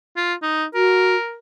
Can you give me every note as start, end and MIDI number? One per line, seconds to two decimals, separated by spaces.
0.17 0.34 65
0.42 0.65 63
0.74 1.16 66
0.74 1.37 70